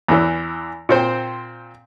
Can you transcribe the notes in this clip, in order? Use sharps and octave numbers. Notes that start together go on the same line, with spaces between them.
E2 E3
A#2 C4 C5 G5